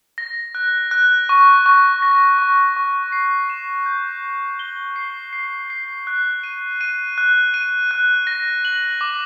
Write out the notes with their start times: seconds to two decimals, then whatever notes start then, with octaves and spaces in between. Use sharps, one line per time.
0.18 A#6
0.55 F#6
0.91 F#6
1.29 C#6
1.66 C#6
2.02 A#6
2.38 C#6
2.76 C#6
3.12 C7
3.50 E7
3.86 G6
4.23 C7
4.59 G7
4.96 C7
5.33 C7
5.70 C7
6.07 F#6
6.43 D#7
6.81 D#7
7.18 F#6
7.54 D#7
7.91 F#6
8.27 A#6
8.65 F#7
9.01 D6